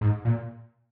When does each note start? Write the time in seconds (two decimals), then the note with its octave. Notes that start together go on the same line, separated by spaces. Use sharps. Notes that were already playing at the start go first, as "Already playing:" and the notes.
0.01 G#2
0.25 A#2